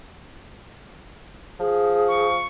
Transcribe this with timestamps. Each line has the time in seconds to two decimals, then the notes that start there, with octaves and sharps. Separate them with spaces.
1.60 F3 G#4
2.08 C#6